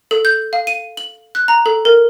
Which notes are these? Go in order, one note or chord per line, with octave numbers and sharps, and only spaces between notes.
A4
G6
F5
D#7
F#7
F#6
A#5
A4
A#4